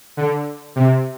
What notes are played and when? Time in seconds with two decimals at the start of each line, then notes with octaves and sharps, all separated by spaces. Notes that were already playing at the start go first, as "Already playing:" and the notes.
0.17 D3
0.76 C3